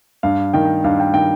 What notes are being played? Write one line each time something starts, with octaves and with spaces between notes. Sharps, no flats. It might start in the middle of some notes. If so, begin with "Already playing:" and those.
G2 F5
D#3 G5
G2 F5
G5
D#3 G5